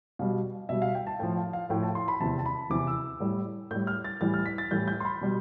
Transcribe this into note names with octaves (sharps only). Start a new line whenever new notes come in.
B2 G3 F5
B2 G3 E5
F5
G5
A5
A2 F3 G5
F5
F5
A2 F3 G5
A5
C6
B5
E2 C3 E3 A5
A5
B5
E2 C3 E3 D6
E6
A2 G3
A2 G3 G6
F6
A6
A2 E3 G3 A6
F6
B6
A6
A2 E3 G3 G6
G6
C6
B5
B2 G3